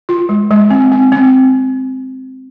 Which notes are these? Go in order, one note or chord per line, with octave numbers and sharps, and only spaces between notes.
F4
G#3
G#3
C4
C4
C4